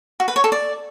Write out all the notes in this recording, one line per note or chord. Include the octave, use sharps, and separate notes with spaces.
F#4
B4
C#5
A4
D5